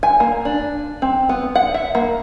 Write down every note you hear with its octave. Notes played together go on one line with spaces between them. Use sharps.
G#5
A#3
D4
C4
B3
F#5
E5
A#3